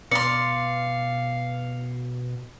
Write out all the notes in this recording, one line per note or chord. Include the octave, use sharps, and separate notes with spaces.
B2 D5 F5 C6 C#7